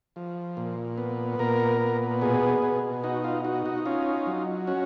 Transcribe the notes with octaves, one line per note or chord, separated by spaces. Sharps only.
F3
A#2
B3
A#2 A#4
B3
B2 G#4
B2
D#4 F#4
F4
D#4 F#4
F#4
C#4 F4
F#3
C#4 F#4